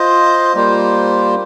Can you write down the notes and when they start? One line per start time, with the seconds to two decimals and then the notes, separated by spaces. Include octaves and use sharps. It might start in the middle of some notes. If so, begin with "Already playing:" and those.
Already playing: F4 C5 D#5
0.55 G3 A#3 F4 C5